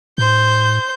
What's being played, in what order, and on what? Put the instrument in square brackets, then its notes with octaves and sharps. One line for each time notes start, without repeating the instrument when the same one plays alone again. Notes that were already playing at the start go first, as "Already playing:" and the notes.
[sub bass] A2 [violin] C5 G6